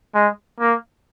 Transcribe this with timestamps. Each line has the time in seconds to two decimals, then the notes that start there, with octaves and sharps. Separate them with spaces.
0.15 G#3
0.60 A#3